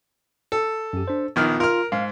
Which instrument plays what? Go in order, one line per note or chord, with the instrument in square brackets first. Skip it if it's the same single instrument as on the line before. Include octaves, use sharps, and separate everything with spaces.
[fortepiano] A4
[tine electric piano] F#2 G4
D4 C5
[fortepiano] A#1 D#3 F6 [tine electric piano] B3 F4
[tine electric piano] F4 [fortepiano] A#4 F6
[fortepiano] G#2 [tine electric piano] F5